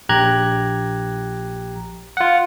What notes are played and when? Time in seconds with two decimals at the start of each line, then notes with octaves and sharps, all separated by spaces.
0.09 A#1 G4 A#5 F#6 G#6
2.17 F4 F#5